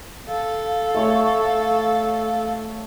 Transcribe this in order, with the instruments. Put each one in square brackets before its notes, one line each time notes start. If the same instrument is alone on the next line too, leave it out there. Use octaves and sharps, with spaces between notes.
[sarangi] A4 [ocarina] F5
[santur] A3 C#5 C#6